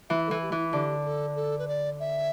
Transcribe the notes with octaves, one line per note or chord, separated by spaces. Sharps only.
E3 E5
E3 A4
G4
E3
E4
E4
D3 G4
A4
A4
B4
D5
E5